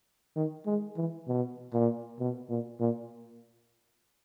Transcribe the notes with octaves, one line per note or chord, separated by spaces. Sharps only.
D#3
G#3
E3
B2
A#2
B2
A#2
A#2